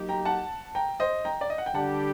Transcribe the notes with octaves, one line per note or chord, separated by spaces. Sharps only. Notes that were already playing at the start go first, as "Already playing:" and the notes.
Already playing: F#3 A#3 D#4 G4
G5 A#5
F#5 A5
G5 A#5
C5 D#5
G5 A#5
D5
D#5
F#5
G5
D3 G3 D4 G4 F#5 A5